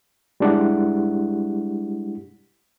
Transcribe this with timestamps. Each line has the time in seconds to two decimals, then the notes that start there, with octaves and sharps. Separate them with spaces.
0.40 G3 G#3 D4 E4 G4 F#5